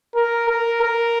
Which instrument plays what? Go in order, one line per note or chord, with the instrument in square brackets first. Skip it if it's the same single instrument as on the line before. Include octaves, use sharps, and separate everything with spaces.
[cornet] A#4
A#4
A#4